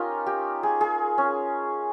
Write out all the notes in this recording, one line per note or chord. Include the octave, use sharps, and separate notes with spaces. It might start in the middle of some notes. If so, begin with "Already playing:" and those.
Already playing: C#4 D#4 F4 G4 A#4
G4
G#4
G#4
C#4